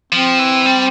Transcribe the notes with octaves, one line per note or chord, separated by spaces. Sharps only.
F3 C4
E3
G3